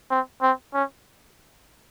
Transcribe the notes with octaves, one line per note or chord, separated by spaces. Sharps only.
C4
C4
C#4